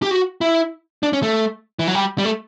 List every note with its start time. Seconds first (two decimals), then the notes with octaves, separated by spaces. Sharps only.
0.02 G4
0.11 F#4
0.41 E4
1.03 D4
1.13 C#4
1.23 A3
1.79 E3
1.87 F#3
1.95 G3
2.18 G3
2.25 A3